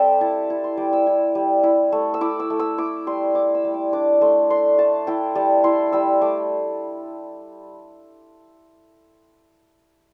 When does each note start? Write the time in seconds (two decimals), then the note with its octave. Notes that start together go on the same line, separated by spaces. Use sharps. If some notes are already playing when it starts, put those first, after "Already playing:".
Already playing: G3 C4 G4 A4 E5 G5
0.21 E4 A5
0.50 E4
0.64 C6
0.77 G3 D6
0.93 E6
1.07 E4
1.35 G3
1.63 E4
1.92 A3
2.14 E6
2.21 E4 D6
2.40 E6
2.50 A3
2.59 E6
2.78 E4 D6
3.07 G3 C6
3.35 E4 D6
3.54 E6
3.65 G3
3.74 D6
3.93 D4 D6
4.21 A3 C6
4.50 D4 C6
4.79 A3 A5
5.07 E4 G5
5.35 G3 A5
5.64 E4 C6
5.92 G3 E6
6.22 A3 D6